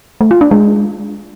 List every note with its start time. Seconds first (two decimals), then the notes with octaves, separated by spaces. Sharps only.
0.21 A3
0.31 F4
0.41 D4
0.51 G#3